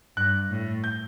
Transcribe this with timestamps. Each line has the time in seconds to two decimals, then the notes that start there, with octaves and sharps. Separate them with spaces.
0.17 G2 F#6
0.50 A2
0.84 G6